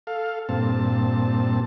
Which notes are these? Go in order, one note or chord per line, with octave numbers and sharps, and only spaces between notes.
A4 F5
G2 A#2 C4 A5